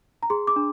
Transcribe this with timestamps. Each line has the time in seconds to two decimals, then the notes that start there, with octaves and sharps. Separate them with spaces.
0.23 A#5
0.30 G#4 C6
0.47 D6
0.56 D4